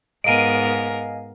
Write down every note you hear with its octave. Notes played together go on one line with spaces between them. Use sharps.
G#2 B3 A#4 D#5 F5 G#5 D7 D#7